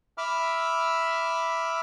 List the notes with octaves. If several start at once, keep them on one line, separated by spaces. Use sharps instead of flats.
E5 B5 D6 E6 F6